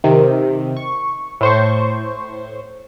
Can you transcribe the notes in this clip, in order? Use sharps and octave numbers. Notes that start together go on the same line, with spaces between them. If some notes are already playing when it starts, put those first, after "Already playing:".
C3 D#3
C#6
A2 C5 C#6